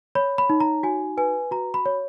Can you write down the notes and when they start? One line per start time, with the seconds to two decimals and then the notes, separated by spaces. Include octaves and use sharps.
0.15 C#5 B5
0.38 B5
0.50 D#4
0.60 A#5
0.83 F#4 G#5
1.17 B4 G#5
1.51 F#4 A#5
1.74 B5
1.86 C#5